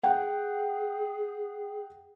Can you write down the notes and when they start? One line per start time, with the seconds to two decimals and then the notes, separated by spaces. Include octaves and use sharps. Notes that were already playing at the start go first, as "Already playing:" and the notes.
0.03 G#4 F#5 G5